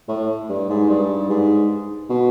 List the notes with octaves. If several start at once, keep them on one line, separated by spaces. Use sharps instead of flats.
A2
G2
G#2
G2
G#2
B2